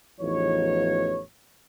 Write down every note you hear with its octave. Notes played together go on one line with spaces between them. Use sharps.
A1 E2 F3 D#4 C#5